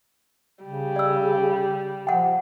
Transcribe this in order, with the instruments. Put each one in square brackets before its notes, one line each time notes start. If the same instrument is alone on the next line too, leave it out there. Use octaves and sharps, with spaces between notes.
[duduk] C#3 [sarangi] G3
[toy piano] D5 E6
[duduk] F3 [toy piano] F#5 G5